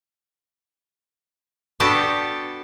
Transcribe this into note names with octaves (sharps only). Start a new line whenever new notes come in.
B3 D4 F#4 G4 A4 A5